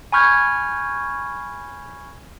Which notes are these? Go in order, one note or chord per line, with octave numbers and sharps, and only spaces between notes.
G#5 B5 C#6 F6 G6 G#6